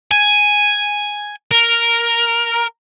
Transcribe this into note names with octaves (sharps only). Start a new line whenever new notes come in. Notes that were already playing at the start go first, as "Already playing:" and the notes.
G#5
A#4